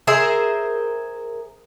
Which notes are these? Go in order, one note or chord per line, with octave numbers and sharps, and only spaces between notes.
G#4 A#4 C5 E5